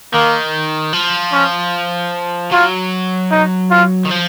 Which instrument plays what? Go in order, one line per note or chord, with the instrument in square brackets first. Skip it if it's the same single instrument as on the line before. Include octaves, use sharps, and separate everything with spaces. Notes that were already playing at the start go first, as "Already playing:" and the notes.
[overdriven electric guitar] D#3 [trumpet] A#3
[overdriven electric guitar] F3
[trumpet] C#4
[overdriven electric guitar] F#3 [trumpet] F4
[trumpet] D#4
F4
[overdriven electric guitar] D#3
F3